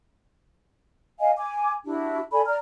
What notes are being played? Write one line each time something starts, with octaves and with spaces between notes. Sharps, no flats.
D#5 F5 G#5
G#5 D6
D4 E4 F#4 G4
A4 D5 G#5 B5
D5 A#5 F6